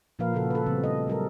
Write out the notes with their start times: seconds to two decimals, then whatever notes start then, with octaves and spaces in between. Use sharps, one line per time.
0.19 A#2 F3 A#3 A#4 B4 F5
0.34 A#2 C#3 F3 A#3 F#4 A4
0.51 A4 B4
0.66 C#3 F3 G3 B3 C4
0.84 A3 A4 D#5
1.07 F#3 G3 A4 A#4